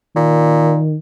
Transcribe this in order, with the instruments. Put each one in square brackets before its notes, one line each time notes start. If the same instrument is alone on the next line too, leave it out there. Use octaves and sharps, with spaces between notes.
[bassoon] A#2 [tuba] D#3